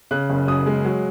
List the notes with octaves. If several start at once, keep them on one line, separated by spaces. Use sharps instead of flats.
C#3 F#6
F#1
F#2 D#6
G#3
F#3